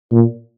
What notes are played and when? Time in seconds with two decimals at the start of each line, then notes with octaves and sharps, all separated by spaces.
0.12 A#2